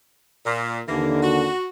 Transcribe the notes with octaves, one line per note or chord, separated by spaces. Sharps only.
A#2
D#2 D3 E3 A#3
F#4